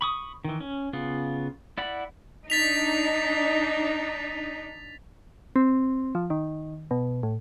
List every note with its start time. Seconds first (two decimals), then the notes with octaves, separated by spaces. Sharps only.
0.01 B5 C#6 D#6
0.45 D#3 E3
0.60 C#4
0.93 C#3 B3 F4
1.78 E4 D5 F#5 B5
2.50 D4 D#4 A6 B6 F7
5.56 C4
6.15 F3
6.30 D#3
6.91 B2
7.23 A2